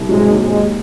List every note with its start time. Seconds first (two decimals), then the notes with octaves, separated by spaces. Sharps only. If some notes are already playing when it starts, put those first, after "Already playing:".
Already playing: C2
0.09 G#2 F#3 G#3
0.30 D#2
0.41 G#2 G#3
0.52 D#2